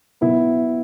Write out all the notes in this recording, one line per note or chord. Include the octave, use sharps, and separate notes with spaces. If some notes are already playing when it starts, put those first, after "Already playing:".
B2 F#3 B3 E4